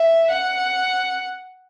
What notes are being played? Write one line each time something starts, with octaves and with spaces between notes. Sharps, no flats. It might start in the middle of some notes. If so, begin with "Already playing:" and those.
Already playing: E5
F#5